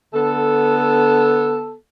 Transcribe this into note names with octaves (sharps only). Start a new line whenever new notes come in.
D3 B3 A4